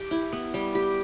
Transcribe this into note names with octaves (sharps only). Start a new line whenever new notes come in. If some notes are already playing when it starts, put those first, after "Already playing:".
Already playing: G4
E4
B3
G3
G4